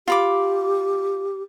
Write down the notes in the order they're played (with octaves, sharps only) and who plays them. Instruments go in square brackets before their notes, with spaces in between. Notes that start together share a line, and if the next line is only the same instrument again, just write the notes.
[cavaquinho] F4 B5 D6 [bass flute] G4